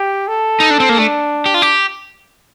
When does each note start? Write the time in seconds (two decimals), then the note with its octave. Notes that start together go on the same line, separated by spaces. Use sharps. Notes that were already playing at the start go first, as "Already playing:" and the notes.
Already playing: G4
0.28 A4
0.60 D#4
0.70 D4
0.80 C4
0.89 A#3
0.98 A3 D4
1.46 G4
1.54 F4
1.62 G4